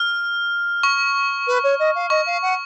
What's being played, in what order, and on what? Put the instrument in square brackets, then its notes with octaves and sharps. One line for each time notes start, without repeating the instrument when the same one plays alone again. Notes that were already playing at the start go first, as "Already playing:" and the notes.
Already playing: [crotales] F6
C#6
[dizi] B4
C#5
D#5
F5
[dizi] D#5 [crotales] C#6
[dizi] F5
F#5